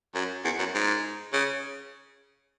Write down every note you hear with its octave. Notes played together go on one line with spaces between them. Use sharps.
F#2
E2
F#2
G#2
C#3